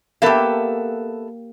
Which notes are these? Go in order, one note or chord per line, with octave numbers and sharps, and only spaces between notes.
A#3 B3 G4 A4 E5